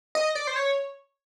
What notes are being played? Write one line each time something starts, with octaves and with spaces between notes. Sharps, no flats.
D#5
D5
C5
C#5